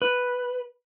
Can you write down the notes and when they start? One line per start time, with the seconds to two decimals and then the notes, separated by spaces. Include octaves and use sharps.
0.02 B4